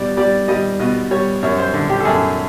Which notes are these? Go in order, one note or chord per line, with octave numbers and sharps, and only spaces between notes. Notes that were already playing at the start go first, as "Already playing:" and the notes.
Already playing: B2 G3 D5
G3 D5
G3 D#5
B2 D#5
G3 C#5
F#2 C#5
C5
D3
G4
A4
F#2 G#4